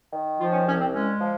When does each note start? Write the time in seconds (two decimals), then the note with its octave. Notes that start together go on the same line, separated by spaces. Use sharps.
0.12 D#3
0.39 F3 F4
0.52 C#4
0.66 C2 C#4
0.80 C4
0.92 G#3 C#4
1.20 F3